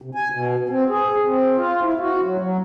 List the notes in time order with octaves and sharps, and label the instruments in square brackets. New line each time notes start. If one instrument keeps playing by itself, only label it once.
[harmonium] C3
G#5
B2
C4
G#4
C4
F4
E4
F#4
F#3
F#3